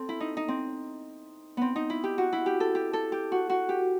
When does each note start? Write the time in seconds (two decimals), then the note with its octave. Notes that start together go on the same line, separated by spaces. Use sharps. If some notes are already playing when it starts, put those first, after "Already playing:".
Already playing: C4 A4
0.09 E4
0.20 D#4
0.37 D#4
0.48 C4
1.57 B3 C4
1.76 D#4
1.90 E4
2.04 G4
2.18 F#4
2.32 E4
2.46 G4
2.60 A4
2.75 G4
2.93 A4
3.12 G4
3.32 F#4
3.50 F#4
3.69 G4